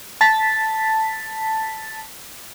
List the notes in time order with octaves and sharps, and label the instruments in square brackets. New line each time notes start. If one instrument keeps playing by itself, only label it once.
[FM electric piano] A5 A6 B6